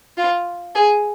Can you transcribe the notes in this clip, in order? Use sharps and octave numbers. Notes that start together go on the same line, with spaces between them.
F4
G#4